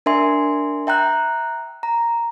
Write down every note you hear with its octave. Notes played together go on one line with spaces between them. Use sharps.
D4 A#4 E5 G#5 C6
E5 G5 A#5 F#6
A#5